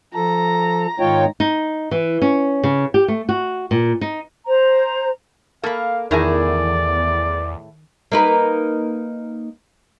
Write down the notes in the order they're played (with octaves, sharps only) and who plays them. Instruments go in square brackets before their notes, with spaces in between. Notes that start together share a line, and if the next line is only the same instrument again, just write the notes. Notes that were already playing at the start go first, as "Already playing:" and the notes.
[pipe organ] F3 A4 [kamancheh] A#5
[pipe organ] G#2 D#3 D#4 [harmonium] F4 C#5 G5
[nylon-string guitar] D#4
E3
C#4
C#3
G4
A3
F#4
A#2
D#4
[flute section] C5 A#5
[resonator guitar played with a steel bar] A#3 [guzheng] A4 B5 [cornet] F5
[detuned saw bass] E2 [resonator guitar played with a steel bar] A2 E4 G#4 [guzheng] D#3 A#5 [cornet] D5
[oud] A#3 D#4 B4